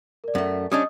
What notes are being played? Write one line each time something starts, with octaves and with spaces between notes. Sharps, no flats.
A#4 D5
F#2 A3
G3 C#4 D4 D#5 D#6